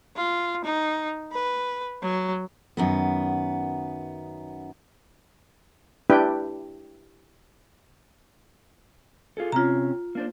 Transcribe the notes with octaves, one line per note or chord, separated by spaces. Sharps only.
F4
D#4
B4
F#3
F#2 D#3 B3
D4 E4 G4 B4 G5
F4 G#4 A4
C3 C4 C#4 F4 A#5
A#3 D4 C5